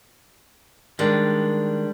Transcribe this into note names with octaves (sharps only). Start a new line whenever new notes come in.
D#3 G3 G#3 D4